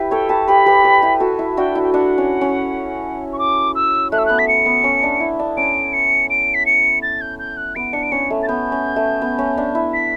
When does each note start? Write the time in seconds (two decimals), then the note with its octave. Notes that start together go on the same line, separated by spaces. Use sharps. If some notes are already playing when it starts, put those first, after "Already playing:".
Already playing: E4 G4 B4
0.11 A4 C#5 G5
0.29 G4 B4 A5
0.47 G4 B4 B5
0.66 G4 B4
0.84 B4 D5
1.02 E4 G4
1.20 F#4 A4
1.39 E4
1.57 D4 F#4 G5
1.75 E4
1.83 G5
1.93 D4 F#5
2.18 C#4
2.41 C#4
3.32 C#6
3.39 D6
3.75 E6
4.12 A3 F#6
4.18 E6
4.26 B3 F#6
4.39 B6
4.48 C#7
4.66 B3
4.84 C#4
5.03 D4
5.20 E4
5.39 D4
5.57 C#4 D7
5.93 C#7
6.30 D7
6.54 B6
6.66 C#7
7.02 A6
7.21 G6
7.39 G6
7.57 F#6
7.75 B3 D7
7.93 D4 C#7
8.03 D7
8.12 C#4 C#7
8.30 A3
8.43 A6
8.48 B3 G6
8.72 C#4
8.96 A3
9.21 B3
9.38 C#4
9.57 D4
9.75 E4
9.93 B6